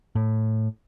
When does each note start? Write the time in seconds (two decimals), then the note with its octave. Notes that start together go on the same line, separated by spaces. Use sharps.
0.15 A2